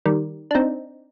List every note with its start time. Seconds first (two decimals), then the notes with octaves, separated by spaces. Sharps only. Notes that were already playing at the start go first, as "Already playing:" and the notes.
0.06 D#3 G3
0.51 D4
0.55 C4 D#4